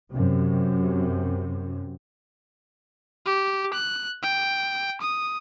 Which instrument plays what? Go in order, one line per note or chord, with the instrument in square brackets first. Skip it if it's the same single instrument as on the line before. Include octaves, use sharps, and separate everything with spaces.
[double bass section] F#2 C3
[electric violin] G4
F#6
G5
D#6